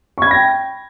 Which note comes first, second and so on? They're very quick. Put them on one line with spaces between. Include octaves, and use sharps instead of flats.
C#6 G#6 B5 A#6 G5